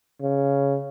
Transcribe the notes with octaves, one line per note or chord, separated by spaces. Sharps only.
C#3